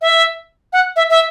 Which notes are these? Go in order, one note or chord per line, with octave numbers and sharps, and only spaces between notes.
E5
F#5
E5
E5